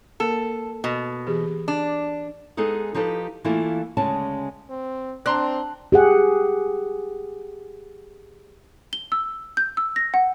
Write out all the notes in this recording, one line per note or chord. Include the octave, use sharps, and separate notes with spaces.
A#3 A4 A#4
B2
E3 G4 G#4
D4
G#3 B3 D#4 G#4 A4
F3 D#4 G4 A4 B4
E3 A3 A#3 E4 F4
D2 C#3 G#3 C#4 A5
C4
C4 D4 A#5 C6 F#6
G4 G#4 F#5
G7
E6
G6
E6
A#6
F#5